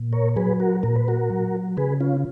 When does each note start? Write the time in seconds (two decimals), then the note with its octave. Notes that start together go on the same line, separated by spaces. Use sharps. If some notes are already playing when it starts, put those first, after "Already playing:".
Already playing: A#2
0.13 A#4 C#5
0.36 F#3 G#4 B4
0.60 F#4 A#4
0.83 A#2 A#4
0.96 B4
1.08 F#4 A#4
1.30 F#3
1.77 C#3 G#4 B4
2.00 C#4 F4